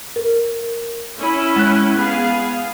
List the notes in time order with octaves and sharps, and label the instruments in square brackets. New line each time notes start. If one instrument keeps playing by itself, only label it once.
[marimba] A#4
[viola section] C#4 E4
[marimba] G#3 F#6
[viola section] B3 G#4 F5